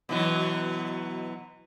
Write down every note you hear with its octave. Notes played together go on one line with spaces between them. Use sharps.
B2 E3 F#3